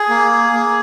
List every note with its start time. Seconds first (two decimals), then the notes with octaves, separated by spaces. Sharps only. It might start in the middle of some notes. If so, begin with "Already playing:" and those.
Already playing: G#4
0.09 A#3
0.31 G#4
0.53 A#3